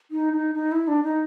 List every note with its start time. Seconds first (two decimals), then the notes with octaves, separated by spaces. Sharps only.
0.11 D#4
0.33 D#4
0.55 D#4
0.72 E4
0.88 D4
1.03 D#4